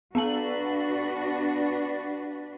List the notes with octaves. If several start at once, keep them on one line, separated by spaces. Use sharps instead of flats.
B3 D4 F#4 B4 A5 F#7